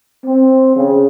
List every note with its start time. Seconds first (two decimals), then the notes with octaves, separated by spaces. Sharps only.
0.24 C4
0.75 C#3